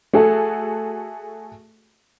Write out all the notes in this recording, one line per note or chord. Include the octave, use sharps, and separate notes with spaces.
A3 F#4 G#4 A4 A5